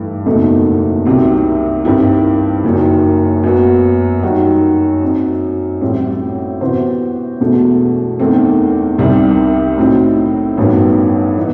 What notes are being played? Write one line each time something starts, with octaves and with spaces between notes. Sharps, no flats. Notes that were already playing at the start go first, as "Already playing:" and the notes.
Already playing: G2 E3 A3 D#4
F#1 E2 B2 A3 D#4
C2 C3 D#3 F#3 C4
G2 D#3 G3 C4 E4
F#1 F#2 D#3
F#2 F#3 B3 F#4
F#2 D#3 G3 D#4 F#4
F#2 F#3 C4 D#4
A1 A2 G3 C4
C3 E3 B3 F#4 C5
E1 E2 B2 A3
E2 D#3 A3 C4
C2 C3 D#3 G3 C4
A2 F#3 C4 D#4
A1 G2 D#3 F#3 B3
E3 B3 D#4